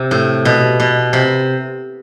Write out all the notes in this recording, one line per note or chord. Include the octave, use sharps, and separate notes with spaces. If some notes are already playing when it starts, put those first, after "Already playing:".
Already playing: C3
A2
B2
B2
C3